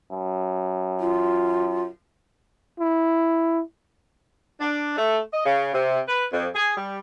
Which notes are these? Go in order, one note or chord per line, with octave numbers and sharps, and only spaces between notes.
F#2
F4
E4
D4
A3
D#5
C#3
C3
B4
F2
G#4
G3